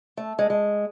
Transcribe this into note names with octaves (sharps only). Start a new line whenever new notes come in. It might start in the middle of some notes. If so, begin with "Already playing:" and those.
A3
G#3
G#3